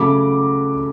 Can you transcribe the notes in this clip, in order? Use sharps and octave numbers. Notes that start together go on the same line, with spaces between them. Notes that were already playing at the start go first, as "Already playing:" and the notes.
Already playing: C#3 F#3 A3 B5 D6